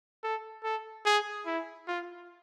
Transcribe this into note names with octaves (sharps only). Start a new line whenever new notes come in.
A4
A4
G#4
E4
F4